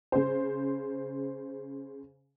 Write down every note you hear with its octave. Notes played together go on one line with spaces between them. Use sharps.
C#3 C5